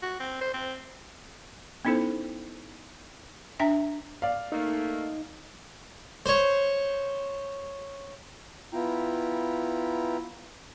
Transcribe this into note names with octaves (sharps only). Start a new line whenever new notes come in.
F#4
C4
C5
C4
B3 C#4 D#4 E4 A4 C5
D4 E5 G5 A#5
D5 F5
A3 A#3 D#4
C5 C#5
B3 E4 F4 G5 A#5